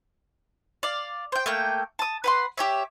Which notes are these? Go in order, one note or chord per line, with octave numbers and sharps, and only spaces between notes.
D5 F5
C5 G5
A3 A#3 G5
A5 D#6
B4 F#5 C6
G4 C#5 E5